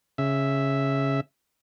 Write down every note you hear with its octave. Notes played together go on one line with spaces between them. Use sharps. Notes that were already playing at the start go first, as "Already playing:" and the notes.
C#3 E5